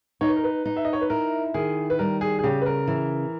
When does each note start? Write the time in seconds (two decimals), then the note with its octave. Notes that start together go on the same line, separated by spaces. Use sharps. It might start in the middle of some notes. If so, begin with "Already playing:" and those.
0.21 D#4 C#5
0.29 B4
0.36 A#4
0.44 B4
0.65 D#4
0.77 E5
0.85 D#5
0.93 C#5
1.01 B4
1.10 E4 A#4
1.54 D#3 G#4
1.90 B4
1.99 G3 A#4
2.21 G#4
2.39 G#4
2.44 C#3 G4
2.61 B4
2.66 A#4
2.88 E3